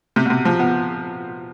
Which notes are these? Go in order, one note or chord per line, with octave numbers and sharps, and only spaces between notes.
C3
B2
C3
F3
B3